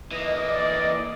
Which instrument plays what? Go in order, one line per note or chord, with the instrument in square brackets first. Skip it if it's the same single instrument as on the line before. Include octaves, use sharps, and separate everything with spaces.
[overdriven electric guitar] E3 A#3 [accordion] D#5
[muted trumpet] D5